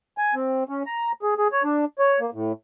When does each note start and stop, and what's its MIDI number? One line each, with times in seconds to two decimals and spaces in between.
0.18 0.35 80
0.35 0.64 60
0.69 0.83 61
0.86 1.12 82
1.23 1.34 68
1.38 1.48 68
1.52 1.63 73
1.64 1.85 62
1.99 2.19 73
2.20 2.30 58
2.34 2.52 45